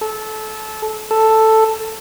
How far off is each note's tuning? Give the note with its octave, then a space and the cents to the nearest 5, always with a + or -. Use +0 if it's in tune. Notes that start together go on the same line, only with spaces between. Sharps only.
A4 -20
A4 +5